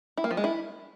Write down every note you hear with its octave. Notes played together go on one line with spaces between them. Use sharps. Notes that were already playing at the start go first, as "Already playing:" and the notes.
E4
A#3
F3
G#3
E4